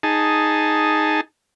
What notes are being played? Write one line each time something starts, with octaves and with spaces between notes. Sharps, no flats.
D#4 G#4 A5